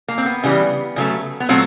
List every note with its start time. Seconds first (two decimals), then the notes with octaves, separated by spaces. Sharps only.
0.08 A#3
0.18 C4
0.26 B3
0.43 C#3 E3 G3
0.96 C#3 F#3 A3
1.40 B3
1.49 A#2 F#3 A3 C4